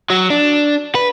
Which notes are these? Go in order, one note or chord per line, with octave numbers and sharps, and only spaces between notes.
F#3
D4
B4